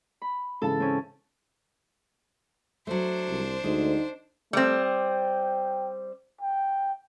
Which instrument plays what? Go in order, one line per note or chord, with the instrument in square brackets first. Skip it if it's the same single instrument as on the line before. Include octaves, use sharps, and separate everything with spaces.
[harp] B5
[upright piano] G#2 C#3 E3 [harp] A4 A5
[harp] C4 C#4
[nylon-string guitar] F#3 A3 [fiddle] D4 C5
[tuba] C2
[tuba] D2 [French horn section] D3 D#4 [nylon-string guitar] G#3
[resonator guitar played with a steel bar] G3 C4 [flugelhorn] A3
[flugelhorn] G5
G5